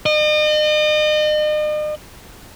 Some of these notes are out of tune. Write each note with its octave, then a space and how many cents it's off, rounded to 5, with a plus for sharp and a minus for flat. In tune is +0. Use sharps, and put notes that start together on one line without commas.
D#5 -40